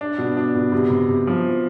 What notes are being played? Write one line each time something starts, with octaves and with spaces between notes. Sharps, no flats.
D4
B2
D4
B2
C3
C3
C3
F3